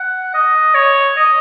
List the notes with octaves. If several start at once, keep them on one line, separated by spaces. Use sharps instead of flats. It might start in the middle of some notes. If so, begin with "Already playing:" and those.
Already playing: F#5
D#5
C#5
D#5